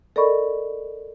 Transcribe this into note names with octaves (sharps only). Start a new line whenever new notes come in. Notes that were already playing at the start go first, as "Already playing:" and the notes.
A4 A#4 D5 D#5 B5 C#6